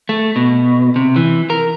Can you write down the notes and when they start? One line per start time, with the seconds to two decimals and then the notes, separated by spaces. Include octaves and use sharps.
0.09 A3
0.36 B2
0.96 C3
1.16 E3
1.50 A#4